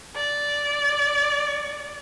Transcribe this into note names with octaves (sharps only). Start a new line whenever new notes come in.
D5